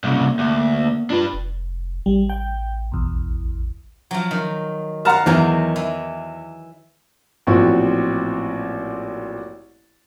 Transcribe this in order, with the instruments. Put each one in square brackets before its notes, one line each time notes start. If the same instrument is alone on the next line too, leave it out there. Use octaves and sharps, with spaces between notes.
[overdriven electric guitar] C2 C#3 [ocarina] A#3
[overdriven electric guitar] D2
[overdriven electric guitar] D4 B4 [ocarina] F4
[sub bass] F1
[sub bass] A1 [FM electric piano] G3
[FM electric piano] G5
B1 E2
[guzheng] F3 F#3
D#3
[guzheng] F5 A5 [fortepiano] F#5 A#5 F6
[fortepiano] E2 [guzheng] D#3 E3 F#3
[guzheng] E3
[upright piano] A1 A#2 F3 C4 F#4 C#6